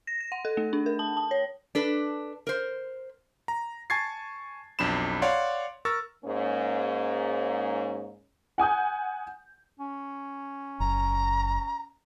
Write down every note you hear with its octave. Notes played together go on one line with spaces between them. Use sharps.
A#6
A#6
F#5
A4
A3
D4
A#4
A5
A5
C#5
D4 A4 B4
A#4 C5
A#5
G#5 A5 C#6 G#6 A6 C7
B1 F2 D4 B5 E7
C#5 D5 F5 F#5 C6
A#4 C#6 E6 A6
G#2 A#3 C#4
F#5 G#5 D#6 G6
C#4
F#1 A#5